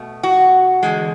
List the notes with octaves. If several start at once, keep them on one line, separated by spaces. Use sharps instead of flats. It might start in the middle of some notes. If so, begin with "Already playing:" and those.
Already playing: B2 A3
F#4
E2 D3 G#3